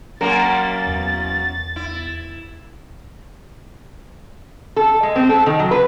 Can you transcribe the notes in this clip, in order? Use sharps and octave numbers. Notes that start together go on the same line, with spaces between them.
F#2 A#3 C#4 A#4 A6
E2
E4
A4
G#3
C4
A4
D#3
F#3
B4